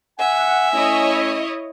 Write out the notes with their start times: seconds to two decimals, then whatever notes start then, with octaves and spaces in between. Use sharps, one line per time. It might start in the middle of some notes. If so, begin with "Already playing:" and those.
0.19 E5 F#5 G#5
0.73 A3 C#4 E4 C#5 D#5